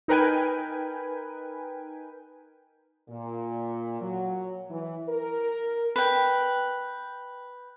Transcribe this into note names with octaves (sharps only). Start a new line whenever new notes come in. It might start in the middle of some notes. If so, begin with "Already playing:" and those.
D#4 A#4 B4 G5 G#5
A#2
F#3
E3
A#4
B4 G5